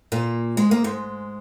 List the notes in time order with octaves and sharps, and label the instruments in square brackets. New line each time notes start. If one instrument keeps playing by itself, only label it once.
[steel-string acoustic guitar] A#2 A#3
G#3
A#3
G#2 G#3